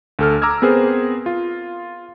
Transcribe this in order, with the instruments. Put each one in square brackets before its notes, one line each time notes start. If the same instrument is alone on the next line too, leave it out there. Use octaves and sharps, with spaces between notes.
[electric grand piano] D2 A4 F6
A#5 D6 E6 F6 G#6
B3 C4 G#4 A#4 C5
F4